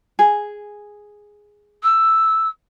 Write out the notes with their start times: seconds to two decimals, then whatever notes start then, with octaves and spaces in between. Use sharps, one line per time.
0.19 G#4
1.83 E6